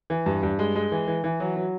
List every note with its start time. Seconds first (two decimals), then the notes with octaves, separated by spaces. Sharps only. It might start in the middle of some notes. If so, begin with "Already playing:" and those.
0.10 E3
0.26 G2
0.43 G2
0.59 G#3
0.76 G#3
0.92 E3
1.07 E3
1.24 E3
1.40 F#3
1.56 F#3